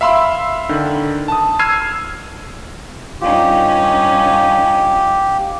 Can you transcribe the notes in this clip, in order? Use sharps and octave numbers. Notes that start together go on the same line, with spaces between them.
E5 F5 B5 C6 E6
D3 D#3
A5 D#6
E6 F6 G#6 C7 D#7
G2 C#4 D#4 F4 G4 D5